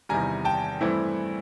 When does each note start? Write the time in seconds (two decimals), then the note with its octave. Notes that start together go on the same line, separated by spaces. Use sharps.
0.09 E2 C3 D#3 G3 G#5 A#5
0.45 G5 A5
0.81 G2 E3 A3 C4 E4